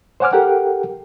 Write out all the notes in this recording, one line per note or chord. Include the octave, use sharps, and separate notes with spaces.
C5 C#5 F#5 G#5 D6 F6
G4 A4 A#4 F#5 G5